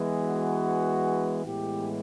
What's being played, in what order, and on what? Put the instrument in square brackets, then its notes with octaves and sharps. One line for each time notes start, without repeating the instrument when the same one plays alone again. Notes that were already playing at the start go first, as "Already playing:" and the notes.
Already playing: [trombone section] E3 G#3 B3
F#4
A2 E3 G#3 B3 G4